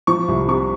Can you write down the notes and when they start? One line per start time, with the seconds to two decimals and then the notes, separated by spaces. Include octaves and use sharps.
0.07 F3 C#6
0.28 C2
0.48 C3 C#6